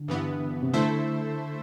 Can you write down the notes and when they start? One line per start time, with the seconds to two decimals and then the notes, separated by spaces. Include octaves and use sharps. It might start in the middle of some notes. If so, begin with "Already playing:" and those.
Already playing: D3
0.08 G2 E3 B3
0.63 C3
0.73 D3 A3 E4 A4 C5 E5